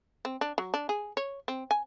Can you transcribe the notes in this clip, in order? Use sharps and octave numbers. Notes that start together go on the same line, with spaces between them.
C4
D4
F#3
D4
G#4
C#5
C4
G#5